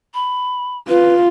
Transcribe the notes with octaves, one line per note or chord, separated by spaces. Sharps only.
B5
F4 B4